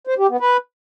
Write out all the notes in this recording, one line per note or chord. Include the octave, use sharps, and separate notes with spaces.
C5
G4
B3
B4